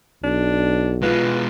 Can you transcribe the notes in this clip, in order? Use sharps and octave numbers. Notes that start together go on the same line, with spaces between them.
B1 D4
B2 G#3 F4 B4